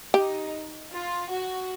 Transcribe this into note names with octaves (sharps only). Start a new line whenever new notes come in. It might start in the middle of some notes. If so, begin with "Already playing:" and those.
D#4 G4
F4
F#4